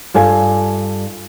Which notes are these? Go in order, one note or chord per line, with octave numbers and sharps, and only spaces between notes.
G2 F4 A4 G#5